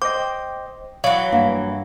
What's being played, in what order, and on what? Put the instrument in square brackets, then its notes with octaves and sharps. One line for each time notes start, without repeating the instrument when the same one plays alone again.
[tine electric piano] C5 D#5 [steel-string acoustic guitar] G5 [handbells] D6
[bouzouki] E3 F#3 [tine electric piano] C#5 F#5 [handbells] F5
[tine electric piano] G2 [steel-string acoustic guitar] A#3